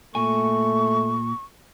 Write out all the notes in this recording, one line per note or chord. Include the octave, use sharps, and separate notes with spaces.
A#2 A3 G#5 C#6